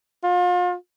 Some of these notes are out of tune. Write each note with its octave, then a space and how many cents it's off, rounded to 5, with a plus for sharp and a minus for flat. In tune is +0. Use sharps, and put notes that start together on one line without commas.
F4 +35